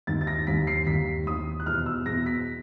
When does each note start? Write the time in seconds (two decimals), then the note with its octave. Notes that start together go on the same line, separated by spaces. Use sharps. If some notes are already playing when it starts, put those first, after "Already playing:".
0.07 D#2 D#3 A6
0.21 A6
0.27 A#6
0.47 D#2 D#3 B6
0.67 C7
0.87 D#2 D#3 B6
1.26 D#2 D#3 D#6
1.60 F#6
1.66 E2 B2 F6
1.86 E6
2.06 E2 B2 A#6
2.26 B6